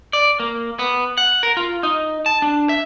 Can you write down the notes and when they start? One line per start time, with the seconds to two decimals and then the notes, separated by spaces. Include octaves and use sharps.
0.13 D5
0.40 A#3
0.79 B3
1.18 F#5
1.43 A#4
1.57 F4
1.83 D#4
2.26 A5
2.42 D4
2.69 E5